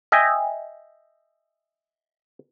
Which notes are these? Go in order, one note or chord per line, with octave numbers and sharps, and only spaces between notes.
D#5 E5 G5 G#5